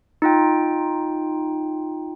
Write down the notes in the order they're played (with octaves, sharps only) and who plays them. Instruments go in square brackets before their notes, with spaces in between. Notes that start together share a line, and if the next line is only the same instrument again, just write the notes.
[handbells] D#4 F4 G5